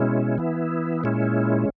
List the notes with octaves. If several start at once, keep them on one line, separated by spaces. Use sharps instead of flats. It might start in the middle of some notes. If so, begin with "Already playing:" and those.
Already playing: B2 G#3 C#4 E4
E3 B3 E4
A#2 G#3 C#4 E4